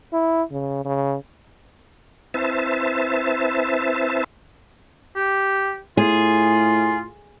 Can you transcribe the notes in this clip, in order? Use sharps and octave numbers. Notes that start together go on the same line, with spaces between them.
E4
C#3
C#3
C4 E4 B4 C5 E5 A5
G4
A2 F4 G#4